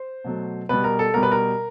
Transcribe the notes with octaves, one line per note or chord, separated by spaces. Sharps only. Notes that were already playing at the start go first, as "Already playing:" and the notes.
Already playing: C5
B2 F#3 A3
B2 G3 B4
A#4
A4
B2 G3 A#4
B4
A#4